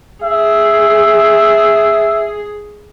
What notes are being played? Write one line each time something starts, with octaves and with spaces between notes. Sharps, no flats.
G#4 E5